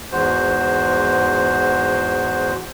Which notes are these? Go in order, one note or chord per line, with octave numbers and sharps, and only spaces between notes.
E2 G#2 F#4 C5